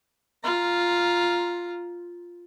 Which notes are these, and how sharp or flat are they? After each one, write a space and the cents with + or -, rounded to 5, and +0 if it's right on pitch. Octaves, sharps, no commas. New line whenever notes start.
F4 +0 A#5 +0